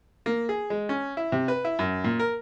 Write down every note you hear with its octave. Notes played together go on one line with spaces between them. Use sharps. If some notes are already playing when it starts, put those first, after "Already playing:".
A#3
G#4
G#3
C#4
E4
C3
B4
E4
F#2
A#2
A#4